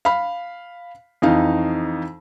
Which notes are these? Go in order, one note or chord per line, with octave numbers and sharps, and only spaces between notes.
F5 B5
F2 E3 D#4 F5